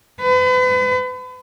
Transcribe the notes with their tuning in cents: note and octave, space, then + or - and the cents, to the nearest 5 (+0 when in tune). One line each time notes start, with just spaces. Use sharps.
B4 +40